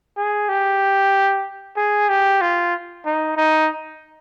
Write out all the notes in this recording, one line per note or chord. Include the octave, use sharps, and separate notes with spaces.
G#4
G4
G#4
G4
F4
D#4
D#4